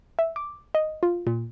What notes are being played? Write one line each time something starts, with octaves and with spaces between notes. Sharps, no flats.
E5
D6
D#5
F4
A#2